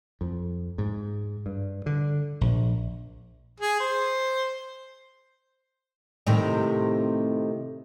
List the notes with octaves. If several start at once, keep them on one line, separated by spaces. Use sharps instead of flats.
F2
G#2
G2
D3
A#1
G#4
C5
A2 C3 D#3